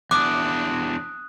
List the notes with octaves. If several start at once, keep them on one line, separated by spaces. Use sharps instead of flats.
E2 D4 D6 D#6 F#6